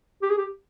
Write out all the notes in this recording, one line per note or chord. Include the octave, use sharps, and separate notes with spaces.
G4
G#4
G4